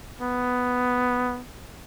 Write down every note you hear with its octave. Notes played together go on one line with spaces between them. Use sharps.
B3